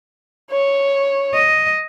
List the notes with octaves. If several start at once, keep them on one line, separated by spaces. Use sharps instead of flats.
C#5
D#5